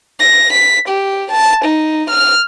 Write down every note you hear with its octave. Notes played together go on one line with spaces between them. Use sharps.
A#6
B6
G4
A5
D#4
F6